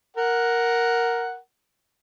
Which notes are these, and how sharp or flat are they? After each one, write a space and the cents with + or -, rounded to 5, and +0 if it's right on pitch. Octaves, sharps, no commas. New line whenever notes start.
A#4 +0 F#5 +0